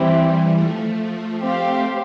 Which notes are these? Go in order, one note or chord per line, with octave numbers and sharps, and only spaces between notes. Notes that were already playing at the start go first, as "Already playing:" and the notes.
Already playing: E3 G3 C4 E4 G4
F3 A3
A3 C4 G4 C5 F5